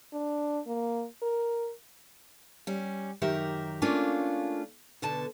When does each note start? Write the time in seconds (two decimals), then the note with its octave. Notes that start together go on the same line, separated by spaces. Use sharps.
0.13 D4
0.67 A#3
1.22 A#4
2.67 G3 C#4
3.22 F#2 D#3 G4 A#4 E5
3.82 A3 A#3 C#4 D4 F4
5.02 B2 D3 A5